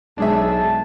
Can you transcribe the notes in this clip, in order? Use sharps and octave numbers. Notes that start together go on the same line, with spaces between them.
B1 G#3 D4 G#4 E5 A5